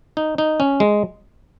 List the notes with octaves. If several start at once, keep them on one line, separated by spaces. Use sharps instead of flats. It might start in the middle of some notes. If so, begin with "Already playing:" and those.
D#4
D#4
C#4
G#3